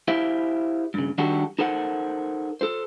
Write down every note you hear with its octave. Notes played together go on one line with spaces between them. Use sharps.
E4 G4 C5 E5 F5
G2 C#3
D#3 G3 D4 F#4 G4 A4
D#4 A4 A#4 C5 F#5
A4 C5